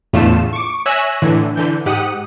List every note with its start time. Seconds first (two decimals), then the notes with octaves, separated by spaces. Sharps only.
0.13 E2 A2 D3 A3 F4 E7
0.53 C#6 D6
0.86 C#5 E5 G#5 E6 F#6 A#6
1.22 A2 D3 E3
1.56 D3 E3 G6
1.86 G#2 G4 F#5 D#6